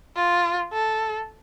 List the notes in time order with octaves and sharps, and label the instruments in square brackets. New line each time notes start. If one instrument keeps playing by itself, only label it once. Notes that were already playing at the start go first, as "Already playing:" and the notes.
[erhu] F4
A4